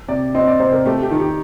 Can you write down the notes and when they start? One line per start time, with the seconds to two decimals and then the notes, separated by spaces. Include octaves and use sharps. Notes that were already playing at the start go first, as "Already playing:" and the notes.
0.08 C3 D5
0.34 C4 D#5
0.47 D5
0.60 C3 C5
0.72 A#4
0.86 A3 G4
1.03 G4
1.11 D#3
1.20 G4